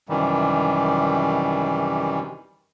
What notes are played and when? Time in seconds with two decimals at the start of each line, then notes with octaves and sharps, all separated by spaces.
0.09 F#2 C3 D#3 E3 G3